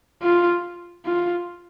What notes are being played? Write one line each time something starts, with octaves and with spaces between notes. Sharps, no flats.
F4
F4